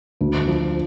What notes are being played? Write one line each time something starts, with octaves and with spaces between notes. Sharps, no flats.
D2
F3